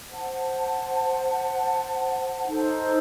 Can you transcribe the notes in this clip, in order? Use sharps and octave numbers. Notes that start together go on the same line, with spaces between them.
C5 F#5 A5
D#4 A4 C5